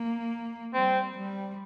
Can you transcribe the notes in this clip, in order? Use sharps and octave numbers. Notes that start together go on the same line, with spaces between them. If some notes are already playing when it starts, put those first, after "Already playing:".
Already playing: A#3
G3 C4
G3